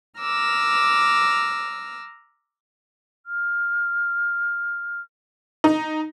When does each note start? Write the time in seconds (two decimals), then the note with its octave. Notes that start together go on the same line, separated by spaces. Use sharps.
0.20 A#5 D6 E6 F6
3.26 F6
5.64 D#4